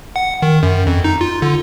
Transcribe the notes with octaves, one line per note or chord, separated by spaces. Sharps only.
F#5
D#3
F#2
F2
D#4
F4
D3